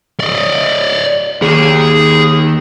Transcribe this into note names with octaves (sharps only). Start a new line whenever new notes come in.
D5 D#5
D#2 G#4